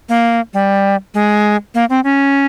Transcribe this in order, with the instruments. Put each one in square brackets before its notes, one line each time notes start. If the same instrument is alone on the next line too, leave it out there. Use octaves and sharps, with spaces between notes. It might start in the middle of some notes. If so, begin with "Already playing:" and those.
[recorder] A#3
G3
G#3
A#3
C4
C#4